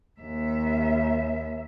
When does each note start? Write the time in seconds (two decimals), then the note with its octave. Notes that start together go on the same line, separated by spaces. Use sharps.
0.21 D#2 E5